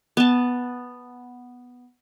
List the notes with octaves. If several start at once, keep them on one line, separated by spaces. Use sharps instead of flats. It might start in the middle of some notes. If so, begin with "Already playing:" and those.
B3 A5